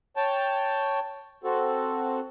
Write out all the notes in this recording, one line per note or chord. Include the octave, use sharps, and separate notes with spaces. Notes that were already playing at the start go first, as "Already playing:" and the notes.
C#5 G5 A5
C4 F#4 A4